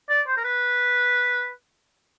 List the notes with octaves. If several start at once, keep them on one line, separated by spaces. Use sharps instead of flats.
D5
C5
A#4
B4